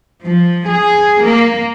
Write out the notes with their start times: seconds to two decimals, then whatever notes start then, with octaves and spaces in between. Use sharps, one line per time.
0.23 F3
0.67 G#4
1.22 A#3